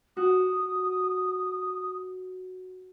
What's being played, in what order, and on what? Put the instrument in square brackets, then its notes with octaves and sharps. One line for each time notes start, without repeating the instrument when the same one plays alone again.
[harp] F#4 [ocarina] D#6